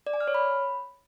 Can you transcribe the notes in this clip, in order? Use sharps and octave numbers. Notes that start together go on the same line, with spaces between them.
D5
G#5
F6
C#5
B5